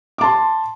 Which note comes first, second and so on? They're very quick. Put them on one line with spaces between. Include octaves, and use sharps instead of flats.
D6 A5 C6